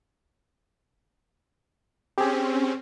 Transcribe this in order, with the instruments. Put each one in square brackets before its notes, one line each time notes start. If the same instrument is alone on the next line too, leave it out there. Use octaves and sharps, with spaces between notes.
[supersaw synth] C4 C#4 [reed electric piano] G4 G#4